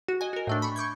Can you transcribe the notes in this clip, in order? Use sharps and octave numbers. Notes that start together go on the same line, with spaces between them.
F#4
D#5 G#5
F#4 A#4
A2 A3 D4
B5 C#6
C#6 D6 G6 G#6